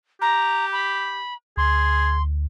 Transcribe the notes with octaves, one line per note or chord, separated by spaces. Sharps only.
G4 A#5
B5
D2 G#4 C6